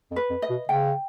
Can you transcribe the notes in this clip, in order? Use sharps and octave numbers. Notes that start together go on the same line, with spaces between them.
F2
B4
F2
D#5
B2
C#3 G5